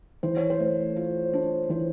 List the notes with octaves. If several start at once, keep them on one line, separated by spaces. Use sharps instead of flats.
E3 C5
C#5
C5
A3
F4
D4
E3 C5